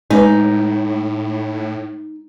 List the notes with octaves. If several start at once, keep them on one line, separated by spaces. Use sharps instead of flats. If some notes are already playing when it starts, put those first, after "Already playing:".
A2 G#3 D#4 B4